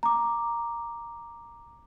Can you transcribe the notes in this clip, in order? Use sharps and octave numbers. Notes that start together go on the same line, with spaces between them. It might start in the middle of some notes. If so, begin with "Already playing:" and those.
A#5 D6